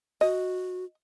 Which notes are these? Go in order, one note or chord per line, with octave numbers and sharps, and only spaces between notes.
F#4 D#5